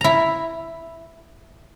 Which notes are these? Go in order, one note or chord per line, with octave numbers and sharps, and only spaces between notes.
E4 A#5